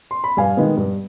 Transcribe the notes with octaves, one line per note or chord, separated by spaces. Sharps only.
C6
B5
G2 F5 G#5
D#3 G#3 B3
G2